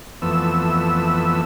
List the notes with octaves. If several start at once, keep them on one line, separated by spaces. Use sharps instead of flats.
F2 E3 A3 B3 E6